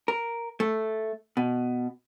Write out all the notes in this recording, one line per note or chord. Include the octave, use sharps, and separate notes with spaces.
A#4
A3
B2